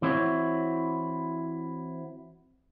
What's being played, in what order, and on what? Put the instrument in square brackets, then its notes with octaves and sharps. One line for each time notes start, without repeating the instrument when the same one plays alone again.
[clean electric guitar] E3 C4 E4 F#4 C#5